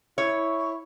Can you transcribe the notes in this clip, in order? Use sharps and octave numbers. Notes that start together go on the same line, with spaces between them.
E4 C#5